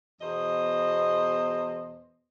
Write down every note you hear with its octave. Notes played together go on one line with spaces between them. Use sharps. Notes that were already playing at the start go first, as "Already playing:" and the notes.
E2 B2 C5 D#5